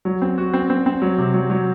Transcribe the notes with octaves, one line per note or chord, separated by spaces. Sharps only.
F#3
C4
F#4
C4
C4
C4
F#3
C3
F#3
F#3